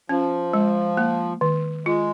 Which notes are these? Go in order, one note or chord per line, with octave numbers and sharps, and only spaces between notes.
F3 C#4
G#3
A#3
D#3
G#3 F4